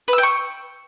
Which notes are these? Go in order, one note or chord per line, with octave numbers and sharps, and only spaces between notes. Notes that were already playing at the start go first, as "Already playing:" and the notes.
B4
E6
G5
C#6